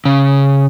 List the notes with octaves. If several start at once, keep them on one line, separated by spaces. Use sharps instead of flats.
C#3